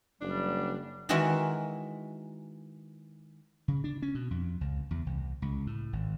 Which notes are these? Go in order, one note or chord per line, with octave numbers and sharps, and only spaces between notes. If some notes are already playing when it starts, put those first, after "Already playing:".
F#1 G3 D4
D#3 E3 G#3 F#4 A#4 E5
C#3
D4
C#4
B2
F2
C#2
E2
C2
C#2
A2
G#1